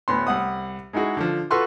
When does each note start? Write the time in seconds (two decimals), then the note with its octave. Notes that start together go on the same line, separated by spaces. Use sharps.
0.08 D2 A2 B3 C6
0.27 C2 F#5 D#6
0.93 G#3 D#4 E4 F#4 G#4
1.17 D3 F3
1.51 F4 F#4 A4 B4 C6 C#6